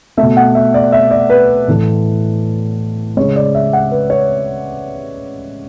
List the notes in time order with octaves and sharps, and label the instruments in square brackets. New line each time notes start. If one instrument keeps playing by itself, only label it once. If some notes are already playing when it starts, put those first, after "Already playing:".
[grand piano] A3 E5
B2
F#5
E5
D5
E5
D5
B4
A2 E3 A3
C#3 G#3 C#5
D5
E5
F#5
B4
C#5